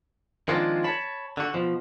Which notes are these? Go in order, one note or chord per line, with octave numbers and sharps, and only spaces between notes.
D#3 F3 G#3 C4 D4 F4
C#5 A5 B5
D3 F#4
B2 F3